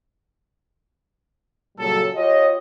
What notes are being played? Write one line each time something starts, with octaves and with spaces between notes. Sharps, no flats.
A#2 C#3 F#3 G3 A4
F4 G4 C#5 D#5